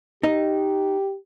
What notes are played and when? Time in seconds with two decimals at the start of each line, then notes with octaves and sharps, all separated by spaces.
0.23 D#4 G4 D#5